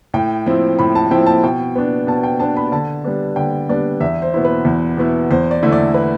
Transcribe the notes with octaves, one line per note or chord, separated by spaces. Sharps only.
A2 G5
F3 C4 E4
A2 B5
A5
F3 C4 E4 G5
A5
B2 G5
B3 D4
B2 A5
G5
B3 D4 A5
B5
D3 A5
G3 B3 D4
D3 G5
G3 B3 D4 D5
E2 E5
C5
B2 B3 E4
B4
E2
B2 B3 E4
E2 C5
D5
D3 A3 E4
D5
B4